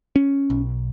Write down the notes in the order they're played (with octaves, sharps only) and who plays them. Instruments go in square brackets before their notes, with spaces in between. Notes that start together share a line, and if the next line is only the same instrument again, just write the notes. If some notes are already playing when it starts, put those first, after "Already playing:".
[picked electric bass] C#4
B1